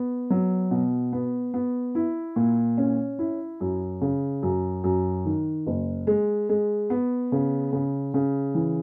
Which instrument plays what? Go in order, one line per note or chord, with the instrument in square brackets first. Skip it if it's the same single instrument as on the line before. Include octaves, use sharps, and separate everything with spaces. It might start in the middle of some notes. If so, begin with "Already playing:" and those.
Already playing: [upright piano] B3
F#3
B2
B3
B3
E4
A#2
C#4
E4
F#2
C#3
F#2
F#2
D#3
F#1
G#3
G#3
B3
C#3
C#3
C#3
E3